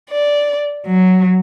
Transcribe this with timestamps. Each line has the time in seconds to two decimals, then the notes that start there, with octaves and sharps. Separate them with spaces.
0.11 D5
0.87 F#3